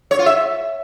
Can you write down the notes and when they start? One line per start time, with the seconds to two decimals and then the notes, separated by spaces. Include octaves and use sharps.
0.11 C#5
0.19 F4
0.26 E5